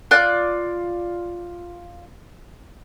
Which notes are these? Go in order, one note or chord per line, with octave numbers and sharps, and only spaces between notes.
F4 D5 F#6